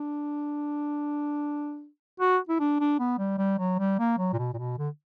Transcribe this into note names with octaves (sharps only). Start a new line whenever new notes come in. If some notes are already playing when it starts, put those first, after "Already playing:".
Already playing: D4
F#4
E4
D4
D4
B3
G3
G3
F#3
G3
A#3
F#3
A#2
B2
A#2
B2
D3